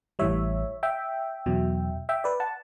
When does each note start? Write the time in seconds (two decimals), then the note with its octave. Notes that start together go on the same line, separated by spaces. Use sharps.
0.19 A1 A2 E3 G3 C#5 E5
0.83 E5 G5
1.46 E2 B2 F#3
2.09 E5 G5
2.24 B4 D5
2.40 F#5 A5